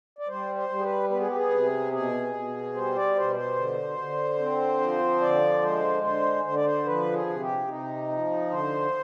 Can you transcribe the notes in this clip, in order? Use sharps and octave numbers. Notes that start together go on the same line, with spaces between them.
D5
G3 C5
C5
G3
G#4
B4
B3 B4
G#4
G4
G#4
C3
B2 G#4
B2
G3 C5
D5
B2 C5
C5
D3
D3
C4
F3
D3 D5
G#3 C5
D3 C5
D3 C5
D5
C5
F3 B4
G#4
C3
G4
C3 D#4
F3
D3 C5